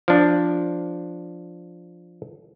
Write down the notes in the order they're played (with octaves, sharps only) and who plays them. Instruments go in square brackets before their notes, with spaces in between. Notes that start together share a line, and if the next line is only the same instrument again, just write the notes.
[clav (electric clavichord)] F3 D4